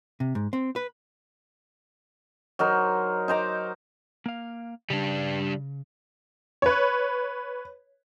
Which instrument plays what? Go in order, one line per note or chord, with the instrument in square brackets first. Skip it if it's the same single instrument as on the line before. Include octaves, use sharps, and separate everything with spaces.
[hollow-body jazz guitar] C3
G#2
C4
B4
[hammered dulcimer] F#3 D#4 A#4 C5
D#4 C5 A#5 D6
[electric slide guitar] A#3 F5
[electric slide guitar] C#3 [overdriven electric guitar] G3 D4
[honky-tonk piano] B4 C#5